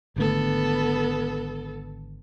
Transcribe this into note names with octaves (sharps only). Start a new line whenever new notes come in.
G#1 D3 A3 B3 A4